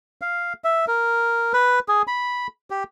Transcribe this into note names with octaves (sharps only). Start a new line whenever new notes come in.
F5
E5
A#4
B4
G#4
B5
G4